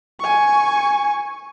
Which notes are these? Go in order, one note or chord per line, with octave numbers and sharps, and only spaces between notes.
G#5 C#6